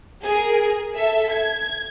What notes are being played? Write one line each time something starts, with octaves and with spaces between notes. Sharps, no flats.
G#4 A#4
A4 E5
G#6